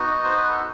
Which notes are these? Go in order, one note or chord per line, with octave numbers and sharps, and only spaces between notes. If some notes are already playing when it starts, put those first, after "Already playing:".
Already playing: B3 D#4 F#4
D#5
C5
B4
A4